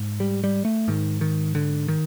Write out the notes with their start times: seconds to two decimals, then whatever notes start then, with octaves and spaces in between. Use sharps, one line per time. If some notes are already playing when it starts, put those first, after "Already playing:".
Already playing: G#2
0.20 G3
0.44 G3
0.65 A3
0.88 G#2 D#3
1.21 D#3
1.55 D3
1.88 D#3